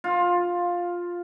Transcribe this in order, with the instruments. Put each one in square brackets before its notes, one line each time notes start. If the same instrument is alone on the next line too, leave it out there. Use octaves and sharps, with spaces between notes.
[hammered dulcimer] F4